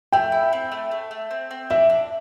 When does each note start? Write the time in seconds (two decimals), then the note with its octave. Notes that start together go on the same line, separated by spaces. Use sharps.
0.12 A3 G5
0.32 E4
0.53 C4
0.72 A3
0.91 A3
1.11 A3
1.31 C4
1.51 C4
1.70 D4 E5
1.90 D4